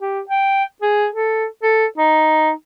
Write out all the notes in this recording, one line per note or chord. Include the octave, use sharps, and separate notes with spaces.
G4
G5
G#4
A4
A4
D#4